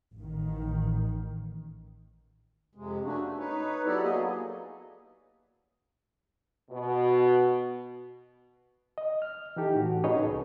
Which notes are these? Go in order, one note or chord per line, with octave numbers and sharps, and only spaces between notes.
A1 D#3
F2 C3 G#3
A3 A#3 C#4 D4 F#4
A3
D#4 B4 C#5
F#3 B3 E4 G4 A4 D5
F#3 A#3 B3 G#4 D#5
B2
D#5
F6
E3 D#4 G4 A4
A2 F#4
C#4 D#4 G#4 B4 C#5 D#5
C2 A4